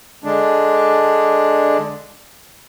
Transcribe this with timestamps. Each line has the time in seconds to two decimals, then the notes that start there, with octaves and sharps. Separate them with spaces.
0.24 D3 G#3 D4